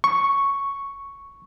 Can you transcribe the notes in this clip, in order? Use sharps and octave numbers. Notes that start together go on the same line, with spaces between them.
C#6